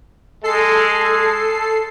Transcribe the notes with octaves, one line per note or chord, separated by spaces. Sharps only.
G#3 A4 C7